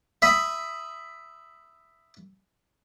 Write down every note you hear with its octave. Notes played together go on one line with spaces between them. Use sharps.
E5 B5 D#6